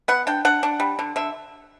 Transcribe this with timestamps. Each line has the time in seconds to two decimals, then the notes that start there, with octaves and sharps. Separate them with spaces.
0.08 B3 F#5
0.27 D4 G5
0.45 D4 F#5
0.63 D4
0.80 G3
0.99 D3
1.16 D3 E5